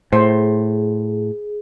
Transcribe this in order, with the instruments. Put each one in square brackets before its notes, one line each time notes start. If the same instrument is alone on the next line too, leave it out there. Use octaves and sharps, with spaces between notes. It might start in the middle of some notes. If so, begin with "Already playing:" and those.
[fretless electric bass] A2 [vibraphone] G#4 [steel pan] C5